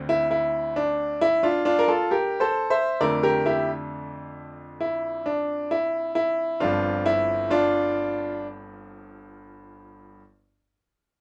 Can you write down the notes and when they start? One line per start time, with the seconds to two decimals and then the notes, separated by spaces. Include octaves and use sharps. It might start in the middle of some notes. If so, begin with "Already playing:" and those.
Already playing: D2 D3 C4
0.09 E4
0.31 E4
0.76 D4
1.21 E4
1.43 D4 F4
1.65 D4 F4
1.79 A#4
1.88 F4 A4
2.11 G4 A#4
2.40 A4 C5
2.70 C5 E5
3.01 F2 D3 A3 D4 A#4 D5
3.23 G4 A#4
3.46 E4 G4
4.81 E4
5.26 D4
5.71 E4
6.15 E4
6.60 G1 G2 F3 C4 D4 F4
7.06 E4
7.51 D4 F4